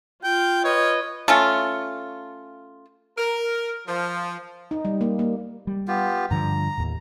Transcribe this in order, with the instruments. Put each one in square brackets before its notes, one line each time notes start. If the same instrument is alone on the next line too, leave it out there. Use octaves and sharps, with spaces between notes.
[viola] F4 [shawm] G5
[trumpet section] B4 D#5 [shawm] C#5
[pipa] A3 C#4 F4
[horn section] A#4
F3
[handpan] D#4
G3
A#3
A#3
[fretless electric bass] G3
[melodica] B3 F4 G4
[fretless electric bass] G2 D3 F3 [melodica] A#5
[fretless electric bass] D#2 A2